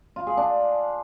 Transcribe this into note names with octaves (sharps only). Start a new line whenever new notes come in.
F4
G#4
D4